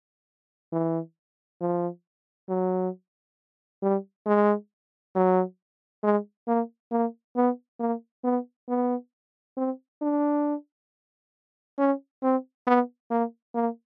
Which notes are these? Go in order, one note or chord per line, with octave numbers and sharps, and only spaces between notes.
E3
F3
F#3
G3
G#3
F#3
G#3
A#3
A#3
B3
A#3
B3
B3
C4
D4
C#4
C4
B3
A#3
A#3